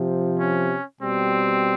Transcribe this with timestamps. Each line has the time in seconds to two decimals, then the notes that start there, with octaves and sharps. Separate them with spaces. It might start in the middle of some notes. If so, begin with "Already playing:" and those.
Already playing: C3 F3
0.39 C#4
1.01 B2 G3 C4